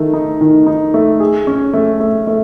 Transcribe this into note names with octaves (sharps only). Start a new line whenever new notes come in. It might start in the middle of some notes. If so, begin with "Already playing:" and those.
Already playing: D#3 A3
D#4
D#3
D#4
A3
G#4
C#4
A3
A3
A3